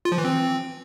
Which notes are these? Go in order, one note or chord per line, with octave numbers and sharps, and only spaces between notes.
F4
F3
E3
C4